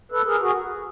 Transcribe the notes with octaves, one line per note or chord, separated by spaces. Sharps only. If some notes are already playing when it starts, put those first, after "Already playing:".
A4 B4
G#4 A#4
F#4 G#4